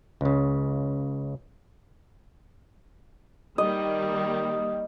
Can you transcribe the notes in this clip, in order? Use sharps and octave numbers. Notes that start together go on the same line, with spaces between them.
C#2 C#3
D#3 G3 A#3 D#5